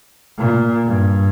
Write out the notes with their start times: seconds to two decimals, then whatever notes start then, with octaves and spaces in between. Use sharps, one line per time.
0.39 A#2
0.87 G2